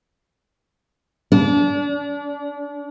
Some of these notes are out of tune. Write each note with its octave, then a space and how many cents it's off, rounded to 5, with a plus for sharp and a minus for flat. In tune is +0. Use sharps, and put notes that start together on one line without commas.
D4 -35